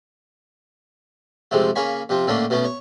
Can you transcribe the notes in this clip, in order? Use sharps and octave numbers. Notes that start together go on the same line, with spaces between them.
F2 C3 G#3 A3
C#3 A#3 C#5 G#5 B5
C3 F3 C4
A2 D3 A3 A#3 C#4 D4
B2 A3 B3 C#4
C#5